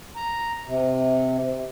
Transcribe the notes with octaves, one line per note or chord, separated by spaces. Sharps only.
A#5
C3